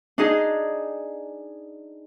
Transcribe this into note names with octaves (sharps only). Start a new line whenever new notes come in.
D4 D#4 G#4 D#5